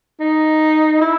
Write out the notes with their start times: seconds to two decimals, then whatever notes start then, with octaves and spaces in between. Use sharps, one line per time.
0.20 D#4
1.01 E4